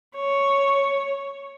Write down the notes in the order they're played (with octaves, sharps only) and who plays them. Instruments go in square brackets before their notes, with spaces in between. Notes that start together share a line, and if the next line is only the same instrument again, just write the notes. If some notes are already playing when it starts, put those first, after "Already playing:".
[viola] C#5